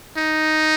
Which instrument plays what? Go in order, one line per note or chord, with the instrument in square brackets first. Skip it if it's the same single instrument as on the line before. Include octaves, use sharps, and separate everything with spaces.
[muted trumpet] D#4